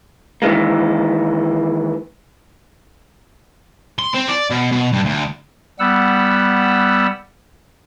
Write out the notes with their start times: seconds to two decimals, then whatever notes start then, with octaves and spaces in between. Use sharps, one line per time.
0.42 D#3 E3 G#3 A#3
3.99 C6
4.14 C4
4.28 D5
4.50 B2
4.72 B2
4.93 G2
5.05 D2
5.79 G3 B3 F#5 E6